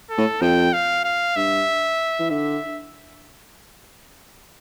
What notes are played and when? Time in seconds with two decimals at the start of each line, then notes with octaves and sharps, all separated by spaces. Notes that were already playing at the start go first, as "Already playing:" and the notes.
0.10 A4
0.18 A2
0.41 F2 G5
0.73 F5
1.04 F5
1.36 G2 E5
2.19 E3
2.30 D3 E5